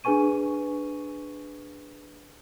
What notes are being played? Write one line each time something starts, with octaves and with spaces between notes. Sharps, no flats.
D4 G#4 B4 G#5 C#6 D#7